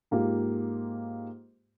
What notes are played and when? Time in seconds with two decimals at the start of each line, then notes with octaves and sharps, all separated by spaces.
0.11 G#2 A#3 F4 G4